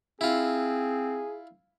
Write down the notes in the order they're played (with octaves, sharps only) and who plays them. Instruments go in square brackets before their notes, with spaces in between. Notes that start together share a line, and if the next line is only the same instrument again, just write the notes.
[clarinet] C4 [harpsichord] E4 F4 [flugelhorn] G#4